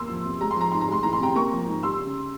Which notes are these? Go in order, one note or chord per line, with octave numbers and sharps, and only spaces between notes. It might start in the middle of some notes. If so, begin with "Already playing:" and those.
Already playing: E2 A#3 C6 E6
F3
C3
G#3 A#5
C6
F3 A#5
G#2 C6
A#5
G#3 C6
E3 A#5
C6
C3 G5 A#5
A#3 A#5 C#6
F3
G#2
G3 C6 E6
C#3